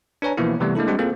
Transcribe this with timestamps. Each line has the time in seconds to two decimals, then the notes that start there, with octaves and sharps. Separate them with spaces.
0.22 D4 B4 C#5 G#5 A#5
0.37 B2 E3 F3 A#3 B3 E4
0.60 C3 E3 G3 A3 B3
0.75 G#3 A#3 D4 E4 A4
0.87 G3 G#3 C4 D4 F#4
0.99 A#3 C4 F4 G#4 A4 C5